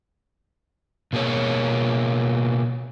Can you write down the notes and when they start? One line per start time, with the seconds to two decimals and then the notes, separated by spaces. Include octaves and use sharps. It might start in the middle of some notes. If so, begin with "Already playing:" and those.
1.13 B2 A#3 G#4 C#5